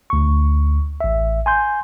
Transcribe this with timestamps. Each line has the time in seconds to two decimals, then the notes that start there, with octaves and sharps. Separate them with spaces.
0.10 D2 C#6
1.01 A1 E5
1.46 G#5 C6 G6